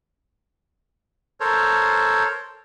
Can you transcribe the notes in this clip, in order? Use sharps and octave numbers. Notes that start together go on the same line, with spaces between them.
A4 A#4 C5 C#5